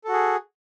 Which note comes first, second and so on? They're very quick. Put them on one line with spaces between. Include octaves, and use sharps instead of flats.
A4 F#4 G#4